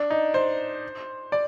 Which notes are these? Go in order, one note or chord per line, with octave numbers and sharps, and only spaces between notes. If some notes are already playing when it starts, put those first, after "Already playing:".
Already playing: D4
D#4
C5
D5